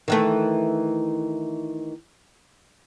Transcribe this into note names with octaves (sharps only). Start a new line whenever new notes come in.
D#3 E3 A3